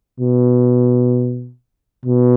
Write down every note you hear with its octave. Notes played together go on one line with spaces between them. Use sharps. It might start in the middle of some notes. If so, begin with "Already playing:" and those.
B2
B2